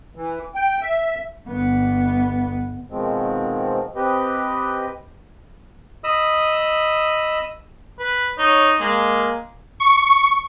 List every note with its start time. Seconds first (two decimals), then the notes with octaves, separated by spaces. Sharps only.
0.15 E3
0.55 G5
0.81 E5
1.48 G1 B3
2.90 B2 D#3 F3 G#3 C4
3.96 C4 G4 B4 D#5
6.04 D#5 B5 D#6 E6
7.99 B4
8.39 D#4 C#5
8.80 G#3 A#3
9.80 C#6